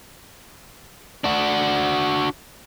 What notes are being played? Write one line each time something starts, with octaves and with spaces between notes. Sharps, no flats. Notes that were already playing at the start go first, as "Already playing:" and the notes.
D4 F#4